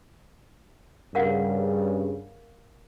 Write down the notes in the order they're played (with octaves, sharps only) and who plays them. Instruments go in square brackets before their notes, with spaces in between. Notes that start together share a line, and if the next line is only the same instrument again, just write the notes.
[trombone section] G2 C#3 [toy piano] A#4 F5 F#5